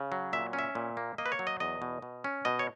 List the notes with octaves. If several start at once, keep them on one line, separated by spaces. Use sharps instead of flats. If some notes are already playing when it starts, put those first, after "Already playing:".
Already playing: C#3
F#3
A#2 E5
C#4
E5
A#2
A#3
A#3 D#5
B4
C#5
F#3
D#5
E2 D#5
B2
B2
C#4
B2 D#5
C#5